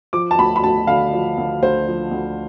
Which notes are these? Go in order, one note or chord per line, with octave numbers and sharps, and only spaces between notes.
F3 D6
A5
D2 B5
B5
D2 A5
D3 F5
F3
D2
D2 C5
F3
D2